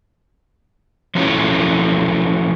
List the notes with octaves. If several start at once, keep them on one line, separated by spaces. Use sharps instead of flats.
F3 F#3 A3 C#4 E4